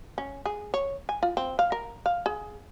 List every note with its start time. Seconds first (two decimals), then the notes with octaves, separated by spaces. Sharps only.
0.18 C#4
0.46 G#4
0.74 C#5
1.09 G#5
1.23 F4
1.37 C4
1.59 F5
1.72 A#4
2.06 F5
2.26 G#4